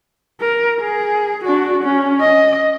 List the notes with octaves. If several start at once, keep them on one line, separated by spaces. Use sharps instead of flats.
A#4
G#4
D4 F#4
C#4
D#5